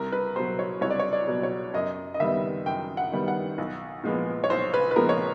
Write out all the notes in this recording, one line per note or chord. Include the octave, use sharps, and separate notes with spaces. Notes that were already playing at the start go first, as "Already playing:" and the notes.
Already playing: C2 A#4
B4
B2 F#3 C5
C#5
C2 C#5
D5
C#5
D5
B2 F#3
C#5
F#2 D#5
D#5
D#3 G3 B3 E5
F#2 G5
F#5
D#3 G3 B3
F#5
B1
A#2 F3 G#3 B3
C#5
B1 C5
B4
B4
A#2 F3 G#3 B3 A#4
C#5